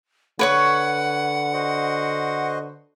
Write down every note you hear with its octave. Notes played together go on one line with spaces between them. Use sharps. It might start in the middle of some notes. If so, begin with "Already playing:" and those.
D3 B4 C#5 F#5 C#6
F#4 C5 D#5